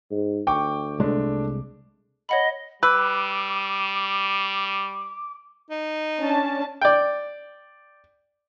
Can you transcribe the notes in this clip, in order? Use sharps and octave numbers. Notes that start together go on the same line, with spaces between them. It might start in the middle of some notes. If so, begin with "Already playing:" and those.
G#2
D2 G5 C#6 D6
C2 G#3 A3 D4
C#5 D#5 F#5 B5
G3 B4 D6 E6
D#4
C#4 D4 A5
D5 G5